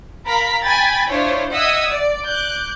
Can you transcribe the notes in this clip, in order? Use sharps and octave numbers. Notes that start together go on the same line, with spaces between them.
A#4 F5 A#5 B5 B6
G5 G#5 B5 G#6 A6
D4 E4 F4 C5 C#5
D#5 E5 F#5 D#6 E6 G#6
D5
D6 F#6 G6